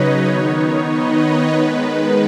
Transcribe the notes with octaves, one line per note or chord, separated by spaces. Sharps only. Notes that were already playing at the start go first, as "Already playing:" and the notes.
Already playing: C#3 F#3 D#4 B4 C#5 D#5
D#3 B3 D#4
B4 D#5
C#5
D#3 G#3 B3 D#4 B4